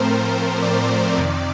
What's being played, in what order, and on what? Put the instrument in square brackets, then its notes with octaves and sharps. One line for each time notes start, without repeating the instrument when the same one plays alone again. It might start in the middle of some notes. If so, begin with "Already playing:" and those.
Already playing: [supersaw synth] A2 F3 A3 C4 A#4 C5
D5
F2 C3 D#3